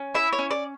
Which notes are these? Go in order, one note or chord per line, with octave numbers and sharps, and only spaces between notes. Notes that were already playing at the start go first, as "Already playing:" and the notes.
Already playing: C#4
E4 E5
C#5
C#4
D5